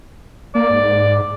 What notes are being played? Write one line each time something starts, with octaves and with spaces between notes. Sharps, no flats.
A#3 D5
G#2